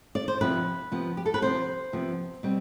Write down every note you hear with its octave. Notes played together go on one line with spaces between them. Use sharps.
D5
C5
C3 F3 B3 B4
C3 F3 B3
G4
A4
B4
C3 F3 B3 C5
C3 F3 B3
B2 G3 C4